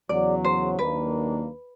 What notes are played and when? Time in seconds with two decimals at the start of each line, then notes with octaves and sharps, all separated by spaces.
0.09 E2 C#3 F#3 D5
0.44 C5
0.79 D#2 D#3 F#3 A#3 D4 B4